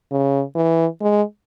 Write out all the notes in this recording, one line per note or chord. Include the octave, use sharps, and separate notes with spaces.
C#3
E3
G#3